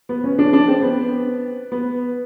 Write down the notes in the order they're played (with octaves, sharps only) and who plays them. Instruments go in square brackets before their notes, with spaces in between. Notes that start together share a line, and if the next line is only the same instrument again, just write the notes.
[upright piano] B3
C#4
D4
D4
C4
B3
B3